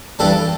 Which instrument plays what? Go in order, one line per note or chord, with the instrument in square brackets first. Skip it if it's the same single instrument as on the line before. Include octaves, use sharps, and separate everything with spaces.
[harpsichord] G2 E3 G3 D4 A4